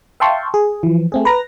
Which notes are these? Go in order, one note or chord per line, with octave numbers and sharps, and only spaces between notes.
E5 F5 G5 A5 C6 C#6
G#4
E3 F3
A3 C4 G#4
B4 A#5 A#6